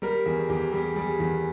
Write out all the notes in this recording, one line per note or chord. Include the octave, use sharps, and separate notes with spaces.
G3 A#4
E2 G#4
E2 G4
G3 G#4
G3 G#4
E2